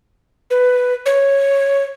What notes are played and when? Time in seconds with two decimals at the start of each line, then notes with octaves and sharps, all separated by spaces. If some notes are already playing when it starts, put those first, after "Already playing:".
0.50 B4
1.06 C#5